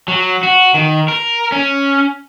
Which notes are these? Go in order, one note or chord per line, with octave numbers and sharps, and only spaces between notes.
F#3
F#4
D#3
A#4
C#4